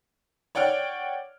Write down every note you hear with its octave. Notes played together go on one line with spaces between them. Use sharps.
C#5 D5 F#5 G5 F6